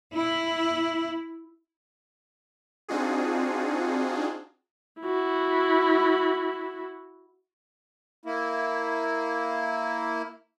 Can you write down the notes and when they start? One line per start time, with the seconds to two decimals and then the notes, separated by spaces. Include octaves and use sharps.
0.13 E4
2.89 C4 D4 D#4 F4 F#4 G#4
5.01 E4 F#4
8.25 A#3 E4